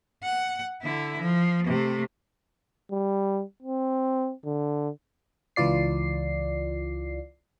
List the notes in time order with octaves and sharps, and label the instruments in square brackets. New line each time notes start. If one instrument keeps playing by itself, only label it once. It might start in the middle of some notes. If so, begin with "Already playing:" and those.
[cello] F#5
D3 E4
F3
C3 A3
[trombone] G3
C4
D3
[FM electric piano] C#2 E3 F4 D5 C7